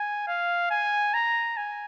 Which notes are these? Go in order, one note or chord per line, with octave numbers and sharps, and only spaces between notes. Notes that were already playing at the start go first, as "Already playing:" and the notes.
Already playing: G#5
F5
G#5
A#5
G#5